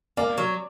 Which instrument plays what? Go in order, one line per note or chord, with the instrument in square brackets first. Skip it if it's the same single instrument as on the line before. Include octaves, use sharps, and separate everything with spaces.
[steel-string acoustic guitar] A#3 [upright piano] D5
[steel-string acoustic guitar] F#3